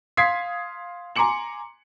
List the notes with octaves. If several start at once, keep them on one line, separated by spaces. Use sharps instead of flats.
F5 C6 D#6 G#6 B6 C7
G#5 A#5 C6 D6 C#7 F#7